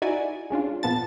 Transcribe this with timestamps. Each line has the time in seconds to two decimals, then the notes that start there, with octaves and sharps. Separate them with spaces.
0.02 D#4 E4 F#4 D5 G#5
0.50 G#3 C#4 D4 F4
0.83 A#2 F3 B3 A5 A6